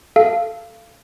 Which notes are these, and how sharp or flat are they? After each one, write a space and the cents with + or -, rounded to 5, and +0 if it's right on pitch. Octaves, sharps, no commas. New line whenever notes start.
A4 +0 F5 -25